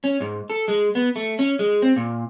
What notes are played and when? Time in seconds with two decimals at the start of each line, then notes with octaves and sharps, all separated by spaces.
0.04 C#4
0.20 G#2
0.50 A4
0.68 G#3
0.95 B3
1.16 A3
1.39 C#4
1.59 G#3
1.82 C4
1.96 A#2